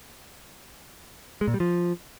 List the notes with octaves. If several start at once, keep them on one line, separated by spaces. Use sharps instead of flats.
G#3
A#2
G3
F3